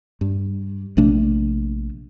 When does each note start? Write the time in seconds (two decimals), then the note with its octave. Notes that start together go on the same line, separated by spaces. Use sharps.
0.21 G2
0.97 A#1 C3 A3 D4